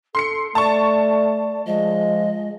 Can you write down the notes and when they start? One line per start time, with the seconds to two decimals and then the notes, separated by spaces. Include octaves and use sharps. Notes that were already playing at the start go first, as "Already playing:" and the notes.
0.15 A4 C6 C7 C#7
0.55 A3 D5 A5 C#6
1.67 F3 G#3 D#5